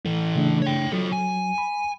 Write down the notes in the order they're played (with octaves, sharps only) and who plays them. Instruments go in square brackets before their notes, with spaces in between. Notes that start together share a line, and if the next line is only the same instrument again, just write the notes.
[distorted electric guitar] E3 A4
[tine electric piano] C#3 A3 D4
[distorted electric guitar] C#5 G5
[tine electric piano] F#3 [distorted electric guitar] F4 A4
[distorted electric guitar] G#5
[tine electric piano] B5